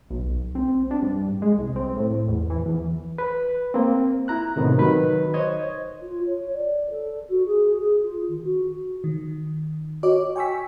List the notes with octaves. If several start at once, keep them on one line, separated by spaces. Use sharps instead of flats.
B1
C4
D4
G2
G#3
C2
C4
A2
E2
E3
E2
B4
A#3 C4
E4 A#5 F#6
A2 C3 D#3 B3
D#3 F#3 B4 F#6
C5 C#5 D#5 G#6
F4
C#5
D5
A4
F#4
G#4
G#4
F4
D#3
F#4
D#3
F#4 C#5 D#5 D6
G5 G#5 C#6 E6 B6